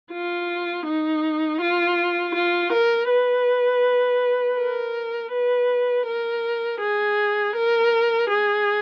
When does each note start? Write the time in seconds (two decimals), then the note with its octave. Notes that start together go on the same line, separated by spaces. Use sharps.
0.12 F4
0.86 D#4
1.61 F4
2.35 F4
2.72 A#4
3.10 B4
4.58 A#4
5.32 B4
6.07 A#4
6.81 G#4
7.55 A#4
8.29 G#4